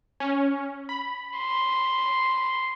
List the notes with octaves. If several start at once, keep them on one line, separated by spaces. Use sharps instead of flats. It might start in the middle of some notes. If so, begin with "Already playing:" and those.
C#4
B5
C6